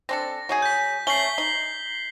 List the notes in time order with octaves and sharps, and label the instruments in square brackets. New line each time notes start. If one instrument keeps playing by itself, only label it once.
[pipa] C4 D4 A4 [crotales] A#6
[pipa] F#3 D#4 G#4
[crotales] G6 B6
[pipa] A3 C#4 [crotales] C7 F#7 G7
[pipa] D#4